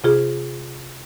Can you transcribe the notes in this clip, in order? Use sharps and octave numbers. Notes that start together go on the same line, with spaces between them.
C3 F4 G#4